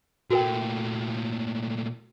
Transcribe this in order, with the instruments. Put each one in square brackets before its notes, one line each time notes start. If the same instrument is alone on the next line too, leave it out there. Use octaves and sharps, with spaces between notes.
[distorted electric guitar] A#2 A3 [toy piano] F#4 A#4 G5